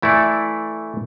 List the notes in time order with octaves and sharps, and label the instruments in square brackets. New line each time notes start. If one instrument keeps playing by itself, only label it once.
[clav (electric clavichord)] E3 A3 E4 A4 D5